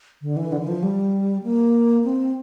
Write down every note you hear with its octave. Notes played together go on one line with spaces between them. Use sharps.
D3
E3
D3
E3
F3
G3
A#3
C4